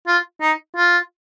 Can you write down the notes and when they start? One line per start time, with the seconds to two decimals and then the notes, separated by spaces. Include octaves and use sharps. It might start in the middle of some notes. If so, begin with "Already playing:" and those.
0.07 F4
0.41 D#4
0.76 F4